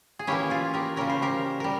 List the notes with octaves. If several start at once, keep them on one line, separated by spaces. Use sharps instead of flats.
G#4
E3 A#3 C#4 E4 G4
F4 G#4
G4 A#4
C#3 G3 C#4 A#4
C5
G4 A#4
G3 A#4